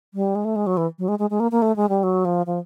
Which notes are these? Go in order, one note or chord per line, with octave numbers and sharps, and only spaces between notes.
G3
G#3
A3
G#3
F#3
E3
F#3
G#3
G#3
G#3
A#3
A#3
A3
G#3
G3
F#3
F3
F3